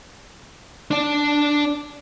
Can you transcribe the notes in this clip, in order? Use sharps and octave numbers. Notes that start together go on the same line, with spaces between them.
D4 D5